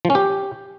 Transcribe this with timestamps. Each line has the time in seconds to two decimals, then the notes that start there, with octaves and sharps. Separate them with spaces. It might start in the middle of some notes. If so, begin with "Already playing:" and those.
0.05 F3
0.10 C#4
0.15 G4